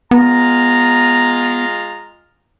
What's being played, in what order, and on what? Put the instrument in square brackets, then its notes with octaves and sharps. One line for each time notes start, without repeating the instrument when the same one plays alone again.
[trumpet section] G#3 F4 A#5 [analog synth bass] B3